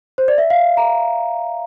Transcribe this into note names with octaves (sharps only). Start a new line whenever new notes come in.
C5
D5
E5
F5
A#5